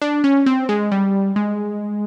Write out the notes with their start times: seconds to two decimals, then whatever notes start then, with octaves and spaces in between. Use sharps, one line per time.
0.02 D4
0.24 C#4
0.46 C4
0.69 G#3
0.92 G3
1.36 G#3